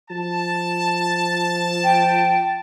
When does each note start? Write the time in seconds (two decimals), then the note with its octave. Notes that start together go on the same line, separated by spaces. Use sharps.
0.10 F3 A5
1.84 G5